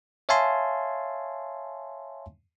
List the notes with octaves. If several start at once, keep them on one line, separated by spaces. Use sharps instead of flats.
C#5 E5 F5 G#5 A5 C6